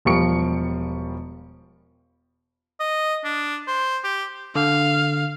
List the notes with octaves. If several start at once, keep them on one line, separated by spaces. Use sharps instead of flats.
E1 F3 G3 C#6 C#7 D7
D#5
D4
C5
G4
D3 F5